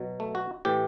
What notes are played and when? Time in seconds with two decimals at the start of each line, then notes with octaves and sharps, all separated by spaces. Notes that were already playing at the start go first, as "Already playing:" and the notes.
Already playing: B2 F#3
0.20 A3
0.35 F#4
0.65 A2 E3 G4